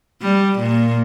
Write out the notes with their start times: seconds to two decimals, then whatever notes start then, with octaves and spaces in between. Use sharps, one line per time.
0.22 G3
0.59 A#2